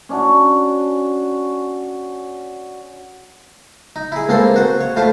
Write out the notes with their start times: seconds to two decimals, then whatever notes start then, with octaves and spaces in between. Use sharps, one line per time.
0.09 C#4 D4 F#4
3.96 D#4
4.12 E4 G#4
4.29 C#2 A#3 C4 A4 C6
4.56 F#4 C5
4.81 C#5
4.96 A2 F4 C5 A5